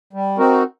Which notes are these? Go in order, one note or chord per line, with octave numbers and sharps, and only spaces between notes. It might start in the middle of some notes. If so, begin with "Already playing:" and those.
G3
C4 D#4 F#4 A#4